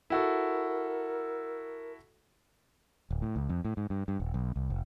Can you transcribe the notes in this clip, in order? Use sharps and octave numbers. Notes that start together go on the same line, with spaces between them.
E4 F#4 A4 A#4
D1
A2
C#2
F2
A2
G#2
G2
G2
D#1
B1
C2
F1